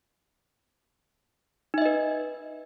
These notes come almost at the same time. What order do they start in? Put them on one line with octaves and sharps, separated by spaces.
D#4 E5 D#5 B4